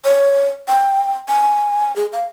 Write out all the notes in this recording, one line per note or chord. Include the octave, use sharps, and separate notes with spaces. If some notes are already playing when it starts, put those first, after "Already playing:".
C#5
G5
G#5
G#4
F5